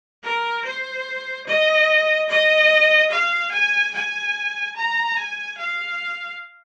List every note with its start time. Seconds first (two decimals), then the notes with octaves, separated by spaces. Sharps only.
0.23 A#4
0.65 C5
1.46 D#5
2.29 D#5
3.11 F5
3.52 G#5
3.94 G#5
4.76 A#5
5.16 G#5
5.58 F5